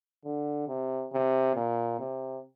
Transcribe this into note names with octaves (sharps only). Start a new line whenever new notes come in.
D3
C3
C3
A#2
C3